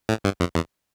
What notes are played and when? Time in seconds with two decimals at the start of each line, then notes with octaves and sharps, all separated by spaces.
0.09 A2
0.24 G2
0.40 F2
0.55 E2